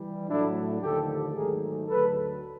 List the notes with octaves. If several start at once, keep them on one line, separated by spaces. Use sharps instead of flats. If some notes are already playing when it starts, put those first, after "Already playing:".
Already playing: E3 G3
A2 F#3 A3 D4 E4
D#2 D3 F3 A3 G4 A4
G#2 D#3 F#3 A3 G#4 A#4
D2 D3 F#3 A4 B4